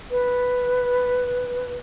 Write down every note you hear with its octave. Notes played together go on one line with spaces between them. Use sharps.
B4